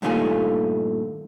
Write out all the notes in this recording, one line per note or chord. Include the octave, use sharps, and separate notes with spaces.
G2 A#2 D#3 A3 F4 G#5